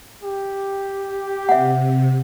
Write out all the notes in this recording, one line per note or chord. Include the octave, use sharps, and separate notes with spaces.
G4
C3 E5 F#5